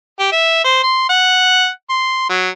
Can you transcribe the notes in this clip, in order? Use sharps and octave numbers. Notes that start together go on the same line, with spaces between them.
G4
E5
C5
C6
F#5
C6
F#3